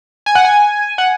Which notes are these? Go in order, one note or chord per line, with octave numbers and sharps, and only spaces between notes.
G#5
F#5
G#5
F#5